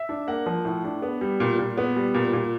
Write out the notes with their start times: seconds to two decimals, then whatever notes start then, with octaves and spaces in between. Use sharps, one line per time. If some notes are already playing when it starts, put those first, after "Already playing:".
Already playing: E5
0.09 D4
0.27 A#3 F#5
0.46 F3
0.65 A2
0.84 D4
1.02 B3
1.21 G3
1.40 A#2
1.58 A#2
1.77 B3
1.96 G3
2.14 A#2
2.33 A#2